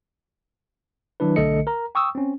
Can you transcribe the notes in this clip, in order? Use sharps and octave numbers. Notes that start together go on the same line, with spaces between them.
D#3 F#3 D4 E4 B4
B1 D3 A3 A4 D#5 C#7
A#4 A#5
G5 C#6 D#6 E6
C4 C#4